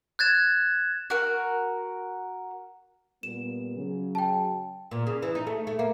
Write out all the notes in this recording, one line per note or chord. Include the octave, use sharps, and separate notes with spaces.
F#6 G#6 A6 E7
F#4 A#4
A#2 G3 B3 E7
C#3 F#3
G5 A5
A#2
C#3
E3
D#4
A3
A3
A#3